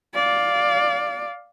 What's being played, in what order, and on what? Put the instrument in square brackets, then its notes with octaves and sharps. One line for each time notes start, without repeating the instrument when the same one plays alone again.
[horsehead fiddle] D5 F5